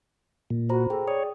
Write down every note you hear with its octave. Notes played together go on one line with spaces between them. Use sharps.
A#2
F#4 C5 A#5 B5
G#4 A4 G5
C#5 D5 D#6